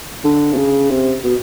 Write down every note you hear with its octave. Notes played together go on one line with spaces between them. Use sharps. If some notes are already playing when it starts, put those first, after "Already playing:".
D3
C3
C#3
C3
B2